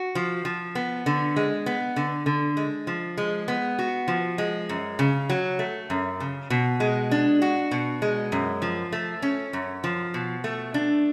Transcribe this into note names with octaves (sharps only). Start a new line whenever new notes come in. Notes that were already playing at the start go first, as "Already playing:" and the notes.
Already playing: F#4
F3
F3
B3
D3
G#3
B3
D3
D3
G#3
F3
G#3
B3
F#4
F3
G#3
F#2
C#3
F#3
A3
F#2
C#3
B2
G#3
D4
F#4
B2
G#3
F#2
F3
A3
C#4
F#2
F3
B2
A3
D4